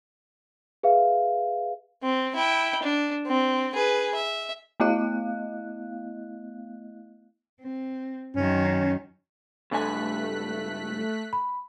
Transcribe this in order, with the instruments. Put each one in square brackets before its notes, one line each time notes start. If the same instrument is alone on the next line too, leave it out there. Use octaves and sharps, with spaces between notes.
[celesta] G#4 B4 E5 F5
[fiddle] C4
E4 G5
D4
C4
G#4 B4
E5
[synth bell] A3 B3 E4 D#5 F5 F#6
[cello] C4
[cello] F#2 D#3 [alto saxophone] C#4
[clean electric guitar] C#2 G2 G#5 [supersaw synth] A3 F#6 B6
[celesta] B5